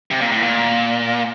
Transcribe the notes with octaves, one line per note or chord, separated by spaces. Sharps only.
C3
A#2
A2
A#2